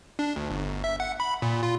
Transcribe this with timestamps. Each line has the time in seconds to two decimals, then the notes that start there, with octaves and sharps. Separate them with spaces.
0.19 D4
0.36 D2
0.50 G1
0.84 E5
1.00 F#5
1.20 B5
1.42 A#2
1.63 F4